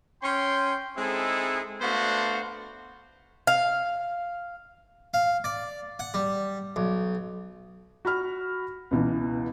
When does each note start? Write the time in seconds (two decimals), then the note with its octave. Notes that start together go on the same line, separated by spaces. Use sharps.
0.22 C#4 G5 C6
0.97 G#3 C4 D#4 E4 G#4 A4
1.82 A3 B3 D4 F#4 C5 F5
3.47 F5
5.14 F5
5.44 D5
5.99 F#5
6.14 G3
6.76 B1
8.05 F#4 B5 F6
8.91 C#2 B2 E3